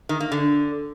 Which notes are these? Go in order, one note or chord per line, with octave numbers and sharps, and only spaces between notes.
D#3
A#3
D3